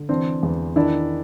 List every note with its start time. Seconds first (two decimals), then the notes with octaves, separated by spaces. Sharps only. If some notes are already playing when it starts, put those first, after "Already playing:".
Already playing: D3
0.09 E3 C4 D4
0.43 E2
0.76 D#3 D4 E4